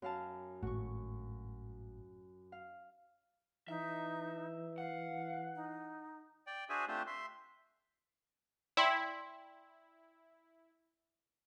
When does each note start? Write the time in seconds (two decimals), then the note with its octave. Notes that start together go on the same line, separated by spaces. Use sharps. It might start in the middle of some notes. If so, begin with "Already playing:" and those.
0.02 F#2 F5 A5
0.62 G#1 A2 F#4 C#6
2.52 F5
3.68 E3 D#4 E5
4.78 F5 F#5
5.55 D#4
6.47 D5 G5
6.69 D4 F#4 G#4 C5 E5 G#5
6.88 A3 C4 D4 F4 G4 C5
7.07 E5 C6
8.77 E4 D5 G5 C6